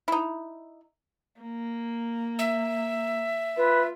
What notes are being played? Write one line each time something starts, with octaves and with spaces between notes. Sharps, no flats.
D#4 E4
A#3
E5
F4 B4